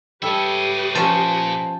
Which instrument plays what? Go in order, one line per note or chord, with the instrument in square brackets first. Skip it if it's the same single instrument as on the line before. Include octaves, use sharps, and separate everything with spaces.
[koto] G3 A4 [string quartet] G4 B4 D#6 [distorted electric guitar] C#5 E5
[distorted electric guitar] A#2 [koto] F3 C#4 [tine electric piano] C5 A5 C6